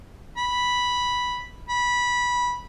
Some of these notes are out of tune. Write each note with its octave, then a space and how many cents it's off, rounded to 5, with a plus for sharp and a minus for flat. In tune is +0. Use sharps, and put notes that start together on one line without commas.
B5 -5
B5 -15